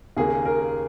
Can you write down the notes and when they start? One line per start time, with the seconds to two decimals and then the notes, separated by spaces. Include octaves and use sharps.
0.17 D#2 C#3 A#3 G#4
0.46 A#4